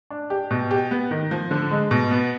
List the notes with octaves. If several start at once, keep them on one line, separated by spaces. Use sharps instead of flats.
D4
G4
B2
G4
B3
D#3
F3
D3
G#3
B2
B3